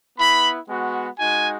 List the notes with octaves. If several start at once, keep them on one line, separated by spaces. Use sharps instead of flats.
B3 E4 B5
G#3 B3 F#4
G#3 D#4 F#4 G#5